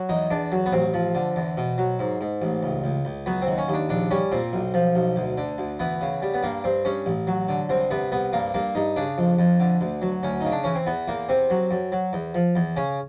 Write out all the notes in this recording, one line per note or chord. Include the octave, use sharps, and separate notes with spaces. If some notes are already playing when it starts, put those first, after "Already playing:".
Already playing: F#3
E2 D#4
E2 D4
F#3
B3
A1 C4
F3
D3
E2
B2
F#3
G#2
G#2
A1
C#2
C#2
C#2
F#3 B3
C4
D#2
C#4
D#2
D4
A#1 D4
G3 C#4
A#2 C4
B1
F3
B1
D2
D3
D2
E3 B3
C#3
G3
B3
G2 A#3
G2 C4
G2 C#4
A1
F#3
D3
C2 C4
C3 B3
C2 B3
G2 A#3
G2 A#3
G2 D#4
C#3 D4
F2
F2
D3
D2
F#3
D2 C#4
C#3 D#4
D4
E3 C#4
C4
E2 B3
E2 A#3
C3 C4
F#3
F#2
F#3
E2
F3
E2
C#3 C#4